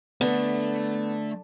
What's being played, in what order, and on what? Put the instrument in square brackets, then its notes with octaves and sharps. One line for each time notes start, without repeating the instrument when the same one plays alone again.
[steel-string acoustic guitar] D3 [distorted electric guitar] A3 [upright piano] B3